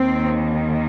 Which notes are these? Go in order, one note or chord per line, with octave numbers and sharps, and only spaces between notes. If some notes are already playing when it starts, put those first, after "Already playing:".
Already playing: D#2 D#3 C4